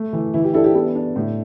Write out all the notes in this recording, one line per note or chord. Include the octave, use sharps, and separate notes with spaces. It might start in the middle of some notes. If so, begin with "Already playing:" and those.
Already playing: A3
E3
E3 E4
G4
D4 E4 A4
G4
B3 E4 A4
D4
A2